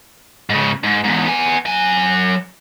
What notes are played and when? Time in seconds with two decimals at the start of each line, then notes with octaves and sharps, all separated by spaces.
0.50 G#2 C#3
0.84 G#2
1.04 E2 G#2
1.26 B3 G#5
1.66 F#3 G#5